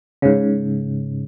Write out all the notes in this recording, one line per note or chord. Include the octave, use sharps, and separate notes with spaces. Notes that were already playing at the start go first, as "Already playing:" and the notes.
G#2 C#3